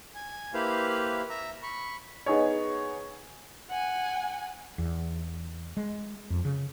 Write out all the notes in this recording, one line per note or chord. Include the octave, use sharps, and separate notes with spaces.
G#5
A#3 E4 G4 B4 C5 F5
E5 A#5
B5 C#6
B3 D#4 G#4 C#5
F#5 G#5
E2
G#3
F2
C#3